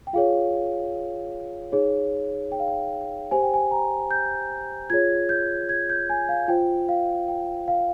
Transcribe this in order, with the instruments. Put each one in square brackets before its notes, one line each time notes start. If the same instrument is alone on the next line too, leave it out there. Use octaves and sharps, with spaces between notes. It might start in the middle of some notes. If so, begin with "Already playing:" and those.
[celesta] G5
F4 G#4 C#5 F5
D#4 G#4 C#5
G5
F5
G5
G4 C5 G#5
G5
G#5
A#5
G6
F4 G#4 C#5 G#6
G6
G#6
G6
G#5
F5
F4 C5 G5
F5
G5
F5